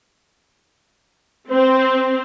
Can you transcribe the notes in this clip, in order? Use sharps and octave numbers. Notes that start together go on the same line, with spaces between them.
C4 C5